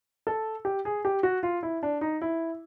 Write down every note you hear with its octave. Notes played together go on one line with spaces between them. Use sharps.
A4
G4
G#4
G4
F#4
F4
E4
D4
D#4
E4